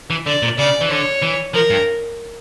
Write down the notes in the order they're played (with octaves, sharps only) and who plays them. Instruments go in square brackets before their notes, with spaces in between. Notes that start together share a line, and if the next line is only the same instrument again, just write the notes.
[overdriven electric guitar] E3
[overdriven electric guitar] D3 [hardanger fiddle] D5
[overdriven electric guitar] A#2
[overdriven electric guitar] C#3 [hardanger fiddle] D5
[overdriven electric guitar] E3
[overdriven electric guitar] D3 [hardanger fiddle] C#5
[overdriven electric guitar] E3
[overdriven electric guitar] F3 [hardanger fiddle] A#4
[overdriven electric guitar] G2